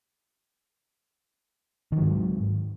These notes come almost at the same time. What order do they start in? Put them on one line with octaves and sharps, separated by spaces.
D#3 F#3 G#2